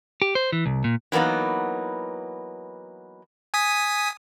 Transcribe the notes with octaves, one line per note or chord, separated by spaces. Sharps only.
G4
C5
E3
C2
A#2
E3 F#3 A#3 B3 D#4
G#5 D#6 B6